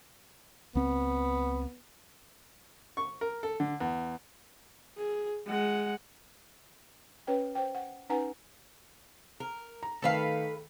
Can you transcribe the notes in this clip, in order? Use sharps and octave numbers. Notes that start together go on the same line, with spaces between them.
C#2 B3 C4
C#6
A#4
A4
D3
E2
G#4
G#3 F#5
C#4 B4 C#5 G5
C5 G5
F#5
C#4 D#4 B4 F#5 G#5 A#5
A#4
A#5
D#3 A3 A4 B4 F5